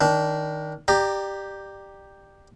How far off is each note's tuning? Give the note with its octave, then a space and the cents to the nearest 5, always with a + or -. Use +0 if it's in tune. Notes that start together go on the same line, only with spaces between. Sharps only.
D#3 +0 D4 -20
G4 +0 D5 +25 A#5 +0